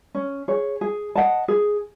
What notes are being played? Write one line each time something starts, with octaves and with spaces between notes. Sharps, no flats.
C#4
G#4 C#5
G#4
D#5 F#5 A5
G#4